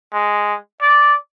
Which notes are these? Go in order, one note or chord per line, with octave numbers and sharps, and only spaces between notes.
G#3
D5